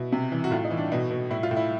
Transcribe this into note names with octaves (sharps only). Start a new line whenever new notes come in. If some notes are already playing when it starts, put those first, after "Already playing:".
Already playing: B2 E4
C3
E3
F#4
A2 F4
D#4
E3
D4
B2 D#4
B2
A2 E4
F4
A2
E4